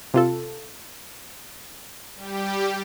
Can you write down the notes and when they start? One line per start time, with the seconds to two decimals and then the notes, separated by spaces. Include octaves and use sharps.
0.14 C3 F4 A4
2.14 G3 G4